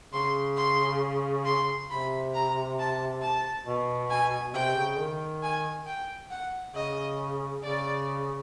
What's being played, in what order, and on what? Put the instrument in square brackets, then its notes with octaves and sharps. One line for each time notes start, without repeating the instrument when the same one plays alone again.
[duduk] C#3 [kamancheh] C6
[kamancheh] C6
C6
[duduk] C3 [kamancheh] B5
[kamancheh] A#5
A5
A5
[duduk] B2
[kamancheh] G#5
[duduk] C3 [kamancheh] G5
[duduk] C#3
D#3
[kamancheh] G#5
G5
F#5
[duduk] C#3 [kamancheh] D#5
[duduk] C#3 [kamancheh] D5